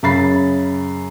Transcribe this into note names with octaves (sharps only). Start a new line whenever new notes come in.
F#2 C#3 B5 A6 C7